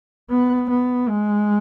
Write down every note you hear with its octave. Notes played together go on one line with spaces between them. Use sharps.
B3
B3
G#3